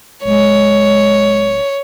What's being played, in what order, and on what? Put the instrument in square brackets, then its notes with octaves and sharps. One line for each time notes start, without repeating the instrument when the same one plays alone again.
[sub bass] D1 [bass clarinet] G#3 [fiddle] C#5